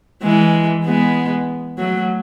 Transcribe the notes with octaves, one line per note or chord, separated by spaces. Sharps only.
E3 G#3
G#3 B3
F#3 A3